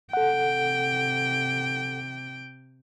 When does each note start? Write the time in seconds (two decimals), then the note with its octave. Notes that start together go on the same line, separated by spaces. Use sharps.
0.13 C3 A4 F#5 G5